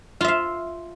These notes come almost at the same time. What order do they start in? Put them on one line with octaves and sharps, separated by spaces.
F4 E5 F5